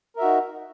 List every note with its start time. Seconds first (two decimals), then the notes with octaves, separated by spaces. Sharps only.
0.16 A#4
0.19 E5
0.21 F#4
0.24 D#4